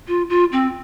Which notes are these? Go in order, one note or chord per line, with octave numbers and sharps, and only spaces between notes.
F4
F4
C4